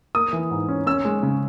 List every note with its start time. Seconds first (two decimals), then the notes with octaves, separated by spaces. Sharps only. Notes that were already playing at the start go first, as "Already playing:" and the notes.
0.15 A#3 D#6
0.33 E3
0.51 G#2
0.69 C#4
0.86 C#4 E6
1.05 G#3
1.23 C#3